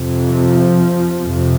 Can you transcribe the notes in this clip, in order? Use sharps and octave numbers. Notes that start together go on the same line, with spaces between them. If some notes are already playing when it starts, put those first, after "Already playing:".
Already playing: F2 C3
F3
F2 C3